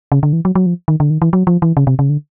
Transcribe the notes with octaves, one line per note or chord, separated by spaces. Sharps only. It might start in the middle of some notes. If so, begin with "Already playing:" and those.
C#3
D3
E3
F#3
F#3
F3
D#3
D3
D#3
E3
F#3
F3
E3
C#3
C3
C#3
D3